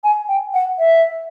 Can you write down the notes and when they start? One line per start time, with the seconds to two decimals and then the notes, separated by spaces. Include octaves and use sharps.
0.04 G#5
0.28 G5
0.54 F#5
0.79 E5